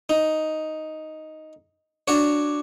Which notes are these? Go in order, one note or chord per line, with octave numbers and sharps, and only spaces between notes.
D#4
D4 F#4 C#5